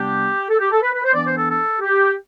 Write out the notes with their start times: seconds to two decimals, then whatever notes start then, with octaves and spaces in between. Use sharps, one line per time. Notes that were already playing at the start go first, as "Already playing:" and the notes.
Already playing: C3 G3 B3 D4 G4
0.50 A4
0.60 G4
0.72 A4
0.82 B4
0.94 B4
1.04 C5
1.14 E3 B3 D4 D5
1.26 C5
1.37 A4
1.48 A4
1.81 G4